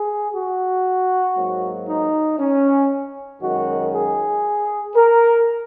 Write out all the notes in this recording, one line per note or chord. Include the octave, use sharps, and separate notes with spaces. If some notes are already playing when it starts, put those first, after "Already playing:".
Already playing: G#4
F#4
G#2 F#3 A#3
D#4
C#4
F#2 D#3 G#3 F#4
G#4
A#4